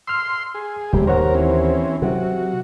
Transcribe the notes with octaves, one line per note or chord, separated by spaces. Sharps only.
C6 E6 F6
G#4
D1 A2 C3 G3 G#3 G4
D#2 A#4 C5 C#5 F#5
E3 C4 C#4
C3 F#3 F#4